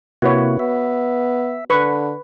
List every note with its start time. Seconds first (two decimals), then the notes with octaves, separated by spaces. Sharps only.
0.22 C3 A#3 E4 F#4 B4 C#5
0.59 B3 E5
1.70 D3 B4 C#6